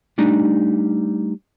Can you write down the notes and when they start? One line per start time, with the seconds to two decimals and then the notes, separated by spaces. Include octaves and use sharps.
0.18 G3 A3 D4 D#4